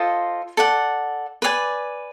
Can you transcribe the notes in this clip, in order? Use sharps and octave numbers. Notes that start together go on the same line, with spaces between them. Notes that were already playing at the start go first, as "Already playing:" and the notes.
Already playing: F4 A4 C5 D#5
A4 D5 F#5
B4 D5 F5 G#5